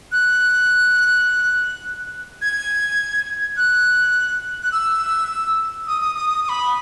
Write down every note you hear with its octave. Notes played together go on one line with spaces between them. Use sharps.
F#6
G#6
F#6
F#6
E6
D#6
D#6
D#6
D#6
D#6
B5